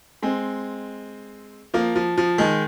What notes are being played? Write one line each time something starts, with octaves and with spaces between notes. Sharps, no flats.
G#3 C4
F3 A#3
F3
F3
D#3 G#3